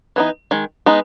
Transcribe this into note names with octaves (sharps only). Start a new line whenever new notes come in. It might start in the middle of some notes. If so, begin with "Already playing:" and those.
E3 B3 D#4
D#3 G#3
G#3 B3 D#4